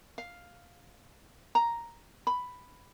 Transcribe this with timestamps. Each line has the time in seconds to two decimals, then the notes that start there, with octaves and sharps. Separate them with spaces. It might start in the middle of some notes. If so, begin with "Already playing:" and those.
0.18 F5
1.55 A#5
2.27 B5